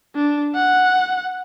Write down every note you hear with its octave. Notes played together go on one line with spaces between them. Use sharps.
D4
F#5